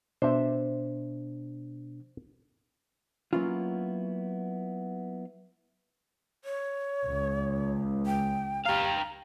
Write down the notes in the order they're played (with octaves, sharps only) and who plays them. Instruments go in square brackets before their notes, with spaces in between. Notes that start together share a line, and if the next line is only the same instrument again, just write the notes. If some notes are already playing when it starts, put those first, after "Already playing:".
[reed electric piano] B2 D4 [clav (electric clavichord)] C5 E5
[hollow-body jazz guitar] F#3 A#3 B3 C#4 E4 F4
[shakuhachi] C#5
[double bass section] C#2
[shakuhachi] G5
[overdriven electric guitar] G4 F5 [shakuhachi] A#5